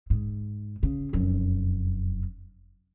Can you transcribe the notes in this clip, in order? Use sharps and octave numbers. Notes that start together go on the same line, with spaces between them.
G#2
C#3
F1 F#2